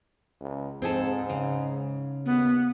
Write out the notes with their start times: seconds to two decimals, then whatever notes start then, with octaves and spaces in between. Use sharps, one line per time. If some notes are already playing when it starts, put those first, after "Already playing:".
0.41 C#2
0.82 G#2 C4 G#4 A4
1.29 C#3
2.26 D#2 B3